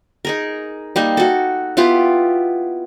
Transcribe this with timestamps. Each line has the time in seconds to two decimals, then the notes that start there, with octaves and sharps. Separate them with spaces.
0.25 D#4 G#4 A#4
0.96 G3 A#3 D#4
1.17 F#4 A4
1.77 B3 E4 F4 G4